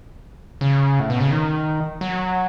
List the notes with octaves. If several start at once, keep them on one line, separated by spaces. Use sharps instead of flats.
C#3
A2
B2
C#3
D#3
F#3